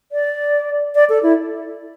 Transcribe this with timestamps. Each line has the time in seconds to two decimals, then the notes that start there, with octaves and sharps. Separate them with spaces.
0.12 D5
0.95 D5
1.09 A4
1.23 E4